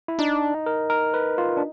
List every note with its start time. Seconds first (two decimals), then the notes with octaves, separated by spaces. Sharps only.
0.08 E4
0.19 D4 D#4
0.54 D#4
0.66 A#4
0.90 A#4
1.14 B4
1.38 F4
1.57 D4